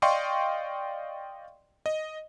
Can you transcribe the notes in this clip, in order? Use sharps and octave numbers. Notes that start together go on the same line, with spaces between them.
D5 D#5 F5 G5 C6 C#6
D#5